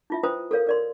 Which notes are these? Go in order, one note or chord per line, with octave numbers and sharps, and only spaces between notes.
E4 F4 E5
F4 B4 C5 G5 A#5 D#6
A4 A#4 C#5 F5
A#4 D5 C6